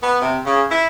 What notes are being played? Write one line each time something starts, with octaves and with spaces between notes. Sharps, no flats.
B3
C3
C#3
E4